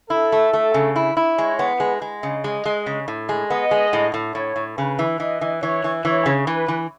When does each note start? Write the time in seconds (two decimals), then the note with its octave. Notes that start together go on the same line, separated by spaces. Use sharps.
0.10 E4 A4
0.32 A3
0.53 A3
0.74 C#3
0.96 E4
1.17 E4
1.37 G#3 C#5
1.59 B3
1.80 G#3 B4
2.02 G#3
2.23 C#3 D#5
2.44 G#3
2.65 G#3
2.86 C#3
3.08 A2
3.29 G#3
3.50 B3 D#5
3.71 G#3
3.93 A2
4.14 A2
4.35 A2 C#5
4.56 A2
4.78 C#3 B4
4.99 E3
5.20 E3 D#5
5.41 E3
5.62 E3 C#5
5.84 E3
6.05 E3 C#5
6.26 C#3
6.47 E3 B4
6.68 E3